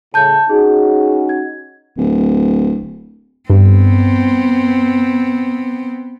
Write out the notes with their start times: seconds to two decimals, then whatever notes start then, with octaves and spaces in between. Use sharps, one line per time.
0.14 A2 C#3 A5 G6
0.49 C#4 D#4 F#4 G#4
1.29 G#6
1.97 D1
3.50 G2 B3 C4